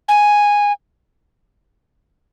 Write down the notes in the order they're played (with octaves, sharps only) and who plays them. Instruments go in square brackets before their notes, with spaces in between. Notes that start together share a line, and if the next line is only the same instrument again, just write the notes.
[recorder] G#5